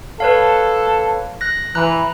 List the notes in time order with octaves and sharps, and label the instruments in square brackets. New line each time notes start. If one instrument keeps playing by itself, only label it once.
[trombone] A4 [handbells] B4 C#5 F5
[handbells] F#6 A#6
[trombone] E3 [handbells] A#5 F#6